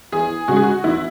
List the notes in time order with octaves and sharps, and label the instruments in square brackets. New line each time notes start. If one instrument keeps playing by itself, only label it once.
[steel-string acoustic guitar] E2 [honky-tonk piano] G#4
[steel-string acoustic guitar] C#3 G#3 [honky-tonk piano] F#4
[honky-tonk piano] G#4
F#4
[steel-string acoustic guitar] E2 [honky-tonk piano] E4